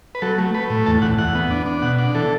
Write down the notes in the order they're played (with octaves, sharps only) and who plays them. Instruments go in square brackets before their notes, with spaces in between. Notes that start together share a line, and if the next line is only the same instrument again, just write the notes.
[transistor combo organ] B4
F#3 A4
A3
A3 B4
A2
E2 A5
E2 F#5
E2 F#5
B3
D4
D4
B2 F#5
D4
E3 A4